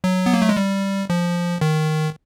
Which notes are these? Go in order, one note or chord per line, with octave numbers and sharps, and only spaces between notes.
F#3
B3
A#3
A3
G#3
G3
F3
D#3